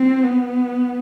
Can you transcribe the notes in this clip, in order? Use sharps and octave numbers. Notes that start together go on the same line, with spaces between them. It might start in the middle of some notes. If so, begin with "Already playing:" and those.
Already playing: C4
B3